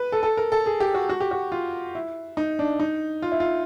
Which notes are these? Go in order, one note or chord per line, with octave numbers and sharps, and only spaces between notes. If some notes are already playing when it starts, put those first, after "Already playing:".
Already playing: B4
A4
A4
A#4
A4
G#4
G4
F#4
F#4
G4
F#4
F4
E4
D#4
D4
D#4
F4
E4
F4